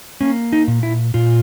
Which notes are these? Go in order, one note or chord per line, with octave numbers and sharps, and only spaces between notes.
A#3 C#4
D#4
A#2
E4
A#2 F4